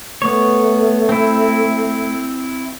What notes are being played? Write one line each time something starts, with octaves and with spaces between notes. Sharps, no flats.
A3 B3 C#5
C4 E4